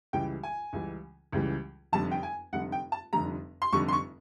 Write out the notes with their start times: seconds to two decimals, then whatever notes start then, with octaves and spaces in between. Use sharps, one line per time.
0.13 C#2 C#3 E3 G3 G5
0.43 G#5
0.73 C#2 C#3 E3 G3
1.33 C#2 C#3 E3 G3
1.93 F1 F2 D3 G3 A5
2.11 G5
2.23 G#5
2.53 F1 F2 D3 G3 F#5
2.72 G5
2.92 A5
3.13 F1 F2 D3 G3 A#5
3.62 C6
3.73 F1 F2 D3 G3 C#6
3.88 C6
3.93 C#6